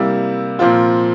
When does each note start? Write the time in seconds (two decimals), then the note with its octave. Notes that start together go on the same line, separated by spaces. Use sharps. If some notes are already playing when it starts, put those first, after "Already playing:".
Already playing: C3 G3 A#3 E4
0.59 A#2 F3 C4 F4